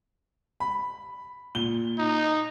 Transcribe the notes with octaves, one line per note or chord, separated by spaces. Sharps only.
B5
A#2 G7
D#4